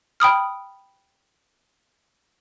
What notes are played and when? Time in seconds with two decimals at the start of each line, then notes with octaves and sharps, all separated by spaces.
0.20 G5 B5 D#6 F6